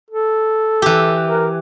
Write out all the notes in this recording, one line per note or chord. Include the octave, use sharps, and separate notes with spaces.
A4
E3 G4
A#4